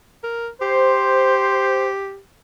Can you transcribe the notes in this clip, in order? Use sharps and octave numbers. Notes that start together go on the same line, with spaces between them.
A#4
G4 C5